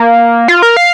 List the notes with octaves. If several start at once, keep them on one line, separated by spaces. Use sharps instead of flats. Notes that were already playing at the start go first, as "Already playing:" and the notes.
Already playing: A#3
F4
A#4
F5